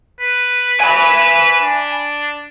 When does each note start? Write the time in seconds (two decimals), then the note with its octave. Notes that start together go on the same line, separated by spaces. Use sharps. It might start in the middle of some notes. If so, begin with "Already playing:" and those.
0.20 B4
0.80 G#5 B5
1.62 D4